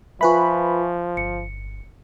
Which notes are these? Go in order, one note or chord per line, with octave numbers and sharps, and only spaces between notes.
F3 F4 B4 E5 G#5 B5 C#6
G1 C#7